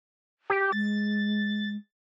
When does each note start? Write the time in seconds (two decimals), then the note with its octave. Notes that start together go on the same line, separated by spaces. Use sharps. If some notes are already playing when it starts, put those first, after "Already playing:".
0.50 G4
0.72 G#3 A6